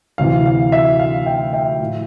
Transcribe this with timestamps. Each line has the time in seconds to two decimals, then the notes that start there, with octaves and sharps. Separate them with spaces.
0.18 D2 C3 E3 F5
0.46 F5
0.72 E5
1.00 F5
1.26 E5 G5
1.53 E5 G5
1.80 A2 F3